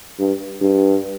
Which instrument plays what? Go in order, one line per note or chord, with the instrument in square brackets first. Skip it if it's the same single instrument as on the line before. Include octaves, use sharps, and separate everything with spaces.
[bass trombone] G2
G2